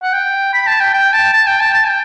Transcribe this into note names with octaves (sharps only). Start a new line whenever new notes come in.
F#5
G5
B5
A5
G5
G5
A5
A5
G5
A5
A5
G5